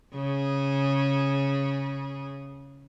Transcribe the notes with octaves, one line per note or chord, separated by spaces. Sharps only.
C#3 G#4